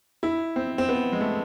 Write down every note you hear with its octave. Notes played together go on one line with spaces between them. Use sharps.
E4
C4
C4
B3
G#3
A3